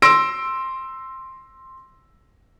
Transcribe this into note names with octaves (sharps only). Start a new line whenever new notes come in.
C6 E6 A#6 D7